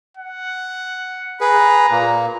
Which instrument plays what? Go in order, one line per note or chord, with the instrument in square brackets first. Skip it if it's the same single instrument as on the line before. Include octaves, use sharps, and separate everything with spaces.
[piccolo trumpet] F#5
[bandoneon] G#4 B4 [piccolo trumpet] A#5
[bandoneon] A#2 A#3